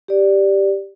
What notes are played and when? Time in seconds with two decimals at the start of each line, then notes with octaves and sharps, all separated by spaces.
0.08 G4 D5